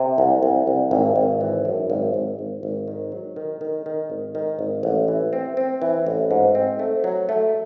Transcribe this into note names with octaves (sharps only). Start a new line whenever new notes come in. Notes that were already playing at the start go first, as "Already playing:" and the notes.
Already playing: C3
C2
C2
C2
G#1
G#1
E3
F#2
G#1
G#1
G#1
G#1
D#3
F#3
D#3
D#3
D#3
G#1
D#3
G#1
A1
E3
C4
C4
E3
A1
G#2
C4
A3
F#3
A3